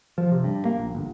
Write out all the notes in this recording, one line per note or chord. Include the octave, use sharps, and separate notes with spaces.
F3
C3
G2
A#3
A#1
G1